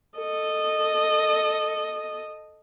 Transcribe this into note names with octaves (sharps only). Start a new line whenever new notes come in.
A4 D#5